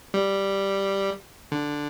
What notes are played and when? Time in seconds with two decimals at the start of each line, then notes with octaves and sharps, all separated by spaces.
0.14 G3
1.52 D3